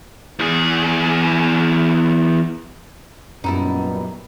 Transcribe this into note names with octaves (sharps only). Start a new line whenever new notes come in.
E2 G#4
F#2 A#2 G3 B3 D#4 E4 A5